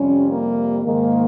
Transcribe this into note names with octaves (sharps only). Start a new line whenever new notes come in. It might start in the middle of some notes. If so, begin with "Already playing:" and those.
Already playing: F2 C3 G3 C#4
A#3
G#2 D#3 G#3 A#3